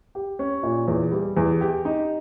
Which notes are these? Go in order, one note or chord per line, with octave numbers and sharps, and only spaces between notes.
G4
C#4
A#2
E2
G3
E2
G4
D#4